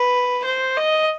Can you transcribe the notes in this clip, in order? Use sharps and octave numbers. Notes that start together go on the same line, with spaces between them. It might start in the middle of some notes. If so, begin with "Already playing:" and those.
Already playing: B4
C5
D#5